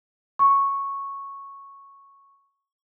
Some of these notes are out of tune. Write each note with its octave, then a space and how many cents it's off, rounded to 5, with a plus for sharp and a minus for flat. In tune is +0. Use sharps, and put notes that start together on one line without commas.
C#6 -5